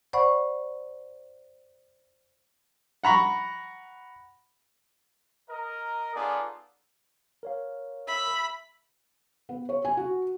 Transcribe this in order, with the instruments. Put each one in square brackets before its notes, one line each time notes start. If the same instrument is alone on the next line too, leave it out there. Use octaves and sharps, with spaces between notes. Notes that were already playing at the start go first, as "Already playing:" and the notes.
[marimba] C5 D5 F#5 B5 C#6
[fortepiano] F#5 A#5 B5 C#6
[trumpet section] A#4 D#5 A#5
B3 D#4 F4 G#4 A4 D5
[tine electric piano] A#4 C#5 F5
[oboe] E5 [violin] B5
[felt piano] B3
C#5
G#5
F#4